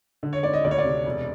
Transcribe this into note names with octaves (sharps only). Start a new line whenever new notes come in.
D3
C#5
G#1 D5
D#5
D2 D5
C#5
D5
C3
E1